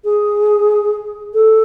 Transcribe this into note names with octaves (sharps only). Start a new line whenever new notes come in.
G#4
A4